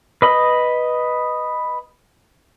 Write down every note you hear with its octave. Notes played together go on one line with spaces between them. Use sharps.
B4 D#5 B5